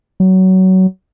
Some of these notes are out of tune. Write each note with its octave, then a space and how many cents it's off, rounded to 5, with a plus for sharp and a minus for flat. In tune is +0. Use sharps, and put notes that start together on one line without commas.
F#3 +20